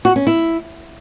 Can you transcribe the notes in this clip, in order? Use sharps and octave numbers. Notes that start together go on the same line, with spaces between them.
F#4
C#4
E4